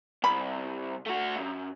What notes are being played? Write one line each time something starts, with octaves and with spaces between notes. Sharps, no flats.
C2 B5
A3 F#4
F#2